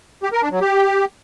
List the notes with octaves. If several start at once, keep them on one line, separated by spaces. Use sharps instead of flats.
G4
A#4
D4
F#3
G4